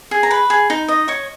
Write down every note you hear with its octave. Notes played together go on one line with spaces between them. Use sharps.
G#4
A#5
B4 B5
G#4
D#4
D#5
C#5 C#6